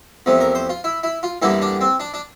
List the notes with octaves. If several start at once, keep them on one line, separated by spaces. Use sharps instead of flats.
E2 C3 F3 A3
A#4
C5
F4
E4
E4
F4
E2 D3 G3 A#3 E4
D4
C4
D4
D4